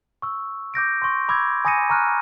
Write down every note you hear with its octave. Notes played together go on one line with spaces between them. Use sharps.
C#6 E6
D6 G6 A#6 D7
C6 C#6
B5 D6 E6 G#6
G#5 B5 D#6 A#6 C#7 D#7
A#5 C#6 F6 F#6 D#7